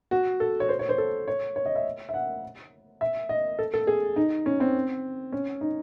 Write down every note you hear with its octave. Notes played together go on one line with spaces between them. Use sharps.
F#4
A4
C#5
C5
C#5
C5
A4
C#5
C#5
D#5
E5
E5
F#5
E5
D#5
A4
A4
G#4
D#4
C#4
C4
C#4
D#4